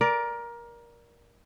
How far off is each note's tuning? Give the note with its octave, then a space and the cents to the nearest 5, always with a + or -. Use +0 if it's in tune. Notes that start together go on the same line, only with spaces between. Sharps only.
A#4 +20 D5 -5